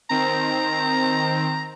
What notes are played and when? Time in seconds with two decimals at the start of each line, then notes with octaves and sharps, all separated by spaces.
0.10 D#3 C4 A#5